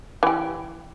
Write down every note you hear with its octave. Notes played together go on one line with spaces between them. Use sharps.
E3 G4